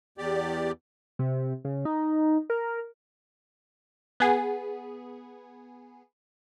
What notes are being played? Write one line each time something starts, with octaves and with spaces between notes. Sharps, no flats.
E2 G4 D5
C3
C#3
D#4
A#4
B3 G#4